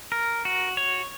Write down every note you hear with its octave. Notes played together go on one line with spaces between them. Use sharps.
A#4
F#4
C#5